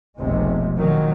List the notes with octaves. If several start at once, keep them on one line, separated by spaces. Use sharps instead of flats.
F1 B1 C3 G#3
A#2 D#3 F#3